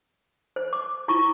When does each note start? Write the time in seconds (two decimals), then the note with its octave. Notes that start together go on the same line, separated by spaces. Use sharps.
0.56 C5
0.73 D6
1.08 E4 F4 C#6